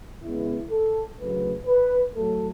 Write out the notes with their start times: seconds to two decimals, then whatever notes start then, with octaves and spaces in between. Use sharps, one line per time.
0.23 E2 C#3 G#3 B3 E4
0.71 A4
1.18 D2 C#3 F#3 A3 B4
1.67 B4
2.14 A2 F#3 A3 A4